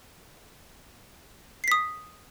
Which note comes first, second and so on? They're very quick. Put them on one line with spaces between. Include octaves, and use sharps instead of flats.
C7 B6 D#6